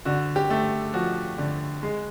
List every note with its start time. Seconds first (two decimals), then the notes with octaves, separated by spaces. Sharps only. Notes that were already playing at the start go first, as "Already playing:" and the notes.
0.05 D3 F#4
0.36 G4
0.50 A3
0.93 F3 F#4
1.38 D3
1.83 G#3